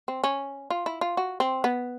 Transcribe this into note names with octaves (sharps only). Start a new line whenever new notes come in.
C4
C#4
F4
E4
F4
F#4
C4
B3